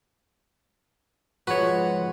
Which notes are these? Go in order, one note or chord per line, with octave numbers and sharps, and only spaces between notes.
G#2 F3 G#3 F#4 B4 C#5